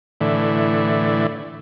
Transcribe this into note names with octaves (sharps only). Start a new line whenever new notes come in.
A2 D3 E3